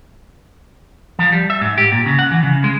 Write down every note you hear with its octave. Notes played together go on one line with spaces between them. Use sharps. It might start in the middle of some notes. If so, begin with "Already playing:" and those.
F3
G3
E5
G#2
G4
A#2
C#3
F#5
E3
C#3
G#3